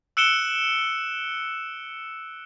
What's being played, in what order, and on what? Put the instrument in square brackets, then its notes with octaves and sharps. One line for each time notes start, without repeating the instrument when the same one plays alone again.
[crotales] E6 F#6 C#7 D7 E7 G7